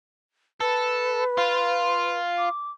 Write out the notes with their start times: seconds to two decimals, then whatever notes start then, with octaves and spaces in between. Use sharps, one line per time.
0.60 A4 B4
1.37 F4
2.38 D6